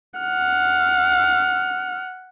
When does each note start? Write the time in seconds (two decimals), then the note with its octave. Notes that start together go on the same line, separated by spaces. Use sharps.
0.20 F#5 F6